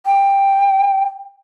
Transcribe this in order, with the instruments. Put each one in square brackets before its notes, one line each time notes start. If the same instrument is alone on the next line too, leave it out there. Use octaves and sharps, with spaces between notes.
[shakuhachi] G5